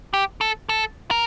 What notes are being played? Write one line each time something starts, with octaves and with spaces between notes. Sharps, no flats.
G4
A4
A4
A#4